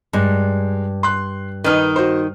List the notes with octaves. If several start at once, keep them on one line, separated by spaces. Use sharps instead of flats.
G2 G#3
C6 F#6
D#3 D#4 B4 F6
F#4 C5